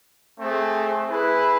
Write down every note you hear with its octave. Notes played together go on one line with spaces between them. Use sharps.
A3 C4 G#4
E4 G#4 B4